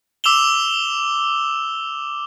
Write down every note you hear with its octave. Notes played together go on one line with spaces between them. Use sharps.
D6 E6 E7 F7 G7